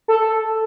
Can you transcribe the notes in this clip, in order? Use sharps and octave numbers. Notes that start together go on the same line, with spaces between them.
A4